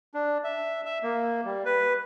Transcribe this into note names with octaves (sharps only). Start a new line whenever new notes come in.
D4
E5
E5
A#3
G3
B4